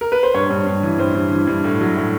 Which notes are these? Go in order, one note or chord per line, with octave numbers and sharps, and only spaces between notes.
A#4
B4
C5
G2 C#5
G2
G2
E3
G2 C5
G2
E3
G2
A2
F#3
A2